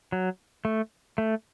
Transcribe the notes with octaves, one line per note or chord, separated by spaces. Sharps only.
F#3
A3
A3